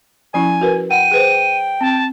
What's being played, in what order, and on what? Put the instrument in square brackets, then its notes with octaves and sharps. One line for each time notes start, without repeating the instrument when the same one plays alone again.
[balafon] F3 C#4 E4 [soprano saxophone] G#5
[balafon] F#4 A#4 B4
[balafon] F#5 [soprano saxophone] G5 [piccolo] D#7
[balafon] G#4 B4 C5
[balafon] C4 [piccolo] A5